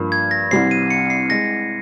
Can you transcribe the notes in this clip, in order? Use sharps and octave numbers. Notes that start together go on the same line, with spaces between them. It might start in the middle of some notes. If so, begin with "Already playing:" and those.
Already playing: G2 F3 A#3
G#6
A#6
C2 C3 G3 C4 C7
D#7
C#7
C7
G#3 A#6